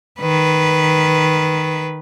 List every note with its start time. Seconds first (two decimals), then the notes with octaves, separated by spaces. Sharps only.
0.19 D#3 B4